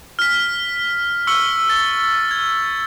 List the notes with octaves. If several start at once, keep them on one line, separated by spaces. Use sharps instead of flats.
F6 B6
C#6 E6 F6 C#7 G7
A6
G#6